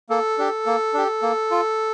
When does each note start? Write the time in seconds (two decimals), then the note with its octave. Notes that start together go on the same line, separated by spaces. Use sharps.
0.09 A#3 A4
0.38 D4 G4
0.66 A#3
0.94 D4 G4
1.22 A#3
1.51 F4